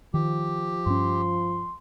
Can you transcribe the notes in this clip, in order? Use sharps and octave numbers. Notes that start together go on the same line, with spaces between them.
D#3 F3 G4
G2 C#4 C6